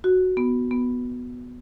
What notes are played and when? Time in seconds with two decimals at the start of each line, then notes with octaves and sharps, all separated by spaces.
0.04 F#4
0.37 B3
0.71 B3